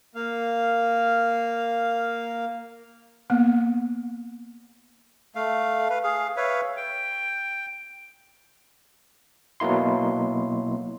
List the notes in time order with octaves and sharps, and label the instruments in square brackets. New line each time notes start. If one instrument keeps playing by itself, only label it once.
[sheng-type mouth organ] A#3 F5
[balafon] A#3 B3
[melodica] A3 F5
B4 F5
G#4 F5
B4 C#5 E5 F5
G5
[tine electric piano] B2 F#3 A#3 E4 C6